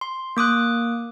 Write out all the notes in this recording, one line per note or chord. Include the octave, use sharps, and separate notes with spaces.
C6
A#3 D6 D#6 F#6